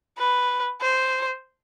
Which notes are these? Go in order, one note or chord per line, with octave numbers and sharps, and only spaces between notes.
B4
C5